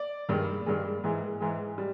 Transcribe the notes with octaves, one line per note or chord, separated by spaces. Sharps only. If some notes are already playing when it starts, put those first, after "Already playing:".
Already playing: D5
G2 D#3 G#3
G2 D#3 G#3
G#2 E3 G#3
G#2 E3 G#3
G3